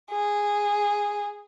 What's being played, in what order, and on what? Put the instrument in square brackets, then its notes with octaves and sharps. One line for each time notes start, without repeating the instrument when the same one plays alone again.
[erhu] G#4